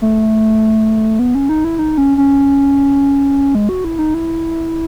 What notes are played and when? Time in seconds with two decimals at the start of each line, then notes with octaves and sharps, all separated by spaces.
0.02 A3
1.19 B3
1.35 C#4
1.49 D#4
1.64 E4
1.79 D#4
1.98 C#4
2.18 C#4
3.55 G#3
3.69 F#4
3.84 E4
3.99 D#4
4.14 E4